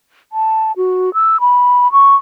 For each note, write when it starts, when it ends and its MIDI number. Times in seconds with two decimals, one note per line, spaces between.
0.33 0.72 81
0.77 1.13 66
1.14 1.40 88
1.40 1.91 83
1.92 2.15 85